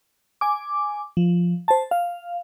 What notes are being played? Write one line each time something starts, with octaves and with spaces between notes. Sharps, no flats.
G#5 D6
F3
C5 A5
F5